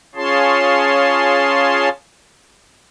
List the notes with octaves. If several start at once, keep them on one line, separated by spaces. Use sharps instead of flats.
C#4 F4 G#4 C#5 A5 C6